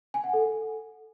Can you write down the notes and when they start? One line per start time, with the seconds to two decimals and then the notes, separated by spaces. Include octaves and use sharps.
0.14 G#5
0.24 F#5
0.33 A4